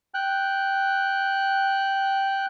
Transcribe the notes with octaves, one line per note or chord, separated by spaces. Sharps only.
G5 F#6